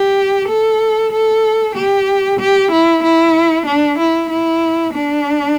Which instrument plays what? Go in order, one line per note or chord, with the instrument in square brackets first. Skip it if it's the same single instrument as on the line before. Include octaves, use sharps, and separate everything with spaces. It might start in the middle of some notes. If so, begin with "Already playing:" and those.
Already playing: [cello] G4
A4
A4
G4
G4
E4
E4
D4
E4
E4
D4